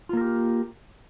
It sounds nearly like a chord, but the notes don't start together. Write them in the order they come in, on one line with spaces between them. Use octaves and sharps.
F4 A#3 A#4 G4